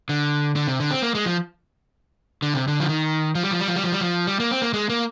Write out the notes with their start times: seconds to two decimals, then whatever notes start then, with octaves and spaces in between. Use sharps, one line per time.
0.09 D3
0.56 D3
0.67 C3
0.80 D3
0.91 C4
1.02 A#3
1.15 G#3
1.26 F3
2.42 D3
2.54 C3
2.68 D3
2.80 F3
2.89 D#3
3.35 F3
3.43 G3
3.51 F3
3.60 G3
3.68 F3
3.76 G3
3.84 F3
3.92 G3
4.01 F3
4.27 G3
4.40 A#3
4.51 C4
4.62 A#3
4.74 G#3
4.89 A#3